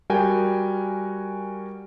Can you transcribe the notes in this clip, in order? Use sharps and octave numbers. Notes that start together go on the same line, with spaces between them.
G3 F#4 A#4 G5 G#5